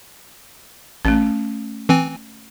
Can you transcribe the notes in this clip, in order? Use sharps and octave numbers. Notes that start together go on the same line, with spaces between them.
A1 A3 C#4
E3 C4 G#5